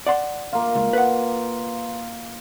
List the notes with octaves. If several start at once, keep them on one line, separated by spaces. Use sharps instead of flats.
D5 F#5 C6
A#3 F4
C#2
B4 F#5